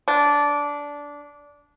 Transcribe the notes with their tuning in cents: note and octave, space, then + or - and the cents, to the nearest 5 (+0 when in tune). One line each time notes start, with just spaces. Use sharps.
D4 -15